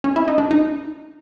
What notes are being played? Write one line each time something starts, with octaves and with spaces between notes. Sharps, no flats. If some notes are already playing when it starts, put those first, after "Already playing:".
C#4
E4
D#4
D4
D#4